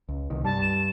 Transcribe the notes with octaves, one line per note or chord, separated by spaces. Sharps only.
C#2
C2 D#3
G2 G3 A5
E7